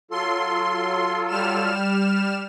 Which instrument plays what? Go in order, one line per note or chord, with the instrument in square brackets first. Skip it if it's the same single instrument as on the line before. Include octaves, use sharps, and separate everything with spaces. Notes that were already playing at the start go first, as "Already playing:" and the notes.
[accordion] F#3 F4 A4 [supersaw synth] C6
[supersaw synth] G3 F6 E7